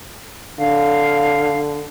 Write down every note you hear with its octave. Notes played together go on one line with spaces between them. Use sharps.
D3 F5